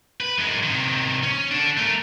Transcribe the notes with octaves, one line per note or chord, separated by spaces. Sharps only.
B4
F#2 G#3
C3 D#3
C#4
D4 A4
A3 A#4